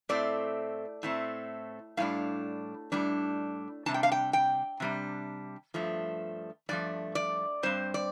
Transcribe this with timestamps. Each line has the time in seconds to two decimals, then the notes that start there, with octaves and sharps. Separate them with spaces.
0.09 A2 A3 C4 D5
1.03 A2 A3 C4
1.97 A2 G3 D4 F5
2.92 A2 G3 D4
3.86 C3 G3 D4 A5
3.94 G5
4.03 F5
4.12 G5
4.33 G5
4.80 C3 G3 D4
5.74 G2 F3 A3
6.69 G2 F3 A3 D5
7.15 D5
7.63 G2 G3 C4 C5
7.94 D5